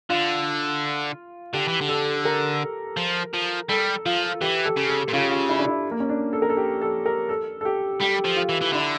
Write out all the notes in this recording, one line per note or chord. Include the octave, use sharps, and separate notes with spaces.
D3 F4
D3 G4
E3
D3
A4
A#4
F3
F3
G3 A4
F3 F4
E3 G4
A4
C#3
A4
A#2
C#3 F4
G4
F4
E4
D4
E4
A#3
C#4
D4
A4
A#4
A4
G4
A4
A#4
A4
A4
G4
G3 G4
F3
F4
E3
E3
D3 E4